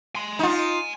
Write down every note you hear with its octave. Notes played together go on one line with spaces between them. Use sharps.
G#5 C6
D#4 F4